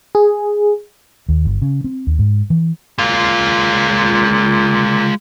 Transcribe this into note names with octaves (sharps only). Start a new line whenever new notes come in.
G#4
D#2
G1
C#3
C4
D#2
G#2
E3
A#2 G#3 F4